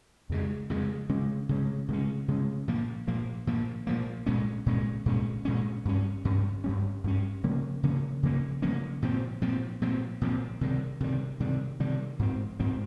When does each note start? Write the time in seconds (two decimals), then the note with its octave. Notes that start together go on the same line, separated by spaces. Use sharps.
0.30 F2 C#3 G#3
0.70 F2 C#3 G#3
1.09 C#3 G#3 C#4
1.49 C#3 G#3 C#4
1.88 C#3 G#3 C#4
2.28 C#3 G#3 C#4
2.68 A#2 F3 A#3
3.07 A#2 F3 A#3
3.47 A#2 F3 A#3
3.87 A#2 F3 A#3
4.26 A#2 G#3 C#4
4.66 A#2 G#3 C#4
5.06 A#2 G#3 C#4
5.45 A#2 G#3 C#4
5.85 G2 G3 C#4
6.25 G2 G3 C#4
6.64 G2 G3 C#4
7.04 G2 G3 C#4
7.43 C#3 F3 A#3 C#4
7.83 C#3 F3 A#3 C#4
8.23 C#3 F3 A#3 C#4
8.62 C#3 F3 A#3 C#4
9.02 A#2 F3 C4
9.41 A#2 F3 C4
9.82 A#2 F3 C4
10.21 A#2 F3 C4
10.61 C3 D#3 G3
11.00 C3 D#3 G3
11.40 C3 D#3 G3
11.80 C3 D#3 G3
12.19 G#2 F3 C4
12.60 G#2 F3 C4